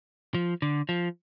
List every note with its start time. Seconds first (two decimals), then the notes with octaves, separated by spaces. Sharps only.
0.34 F3
0.62 D3
0.89 F3